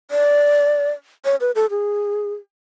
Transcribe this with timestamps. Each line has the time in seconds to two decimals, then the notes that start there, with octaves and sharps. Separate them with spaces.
0.11 D5
1.25 C#5
1.41 B4
1.55 A4
1.70 G#4